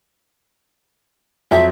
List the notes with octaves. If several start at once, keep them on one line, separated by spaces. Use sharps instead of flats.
F2 F#3 C4 E5